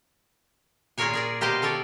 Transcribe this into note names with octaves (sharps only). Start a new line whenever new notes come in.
A#2 F4 G#4 A#4 C#5 G#5
G#4 A#4 D5
B2 G4 A#4 C5 D#5 F5
F4 A4 C#5 D5